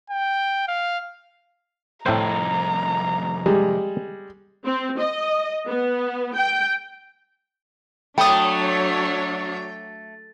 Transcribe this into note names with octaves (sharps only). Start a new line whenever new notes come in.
G5
F5
C2 F2 A2 C4 C5 A#5
G3 G#3
C4
D#5
B3
G5
F#3 A3 D4 C#5 G5 B5 D#6